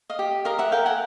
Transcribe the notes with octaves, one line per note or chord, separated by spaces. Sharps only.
D#5 F5
G4
A#4 D#5 F5
E5 F#5
A#4 F5 G5
F#5 G#5